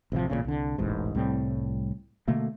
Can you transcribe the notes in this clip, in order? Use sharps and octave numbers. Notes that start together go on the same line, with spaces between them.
A1 C3 D#3 F3
A1 F#2 A#2 C#3
C2 D3
E1 A1 G#2
C2 A2 G3 C4
B2 D3 A3 A#3